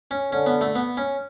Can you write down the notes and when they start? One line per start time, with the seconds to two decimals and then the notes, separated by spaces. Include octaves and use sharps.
0.11 C#4
0.32 D3 C#4
0.46 B3
0.61 A3
0.75 B3
0.97 C#4